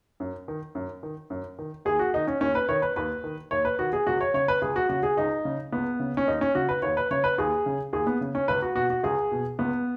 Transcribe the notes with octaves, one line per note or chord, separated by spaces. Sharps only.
F#2
D#3
F#2
D#3
F#2
D#3
D#2 G#4
F#4
D#3 D#4
C#4
D#2 C#4
B4
D#3 C#5
B4
D#2 B4
D#3
D#2 C#5
B4
D#3 F#4
G#4
C#2 F#4
C#5
C#3 C#5
B4
C#2 G#4
F#4
C#3 F#4
G#4
C#2 D#4
C#3
C#2 B3
C#3
C#4
D#2 D#4
C#4
C#3 F#4
B4
D#2 C#5
B4
C#3 C#5
B4
D#2 G#4
C#3
D#2 G#4
B3
C#3
C#4
C#2 B4
F#4
B2 F#4
F#4
C#2 G#4
B2
C#2 B3